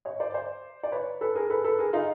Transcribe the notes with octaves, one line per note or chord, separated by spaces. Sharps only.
C#5 D#5
C5 D5
C5 D5
D5
B4 C#5
A4 B4
G#4 A#4
A4 B4
A4 B4
G#4 A#4
D#4 F4